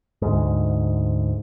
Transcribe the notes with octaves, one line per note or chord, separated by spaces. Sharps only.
D2 G#2